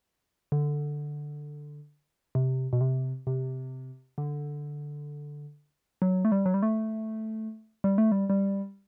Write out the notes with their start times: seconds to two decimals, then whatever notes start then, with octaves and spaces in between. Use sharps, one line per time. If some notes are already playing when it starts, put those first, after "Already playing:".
0.52 D3
2.35 C3
2.73 B2
2.81 C3
3.27 C3
4.18 D3
6.02 F#3
6.25 A3
6.32 G3
6.46 F#3
6.54 G3
6.63 A3
7.84 G3
7.98 A3
8.12 G3
8.30 G3